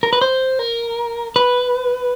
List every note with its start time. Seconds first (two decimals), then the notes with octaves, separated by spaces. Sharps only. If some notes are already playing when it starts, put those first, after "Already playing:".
0.03 A#4
0.13 B4
0.21 C5
0.59 A#4
1.36 B4